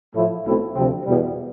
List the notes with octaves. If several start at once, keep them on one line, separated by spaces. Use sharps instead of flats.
A2 F3 A3 E4
B1 B2 A3 C4 E4
D2 C3 F3 C4
E2 B2 G3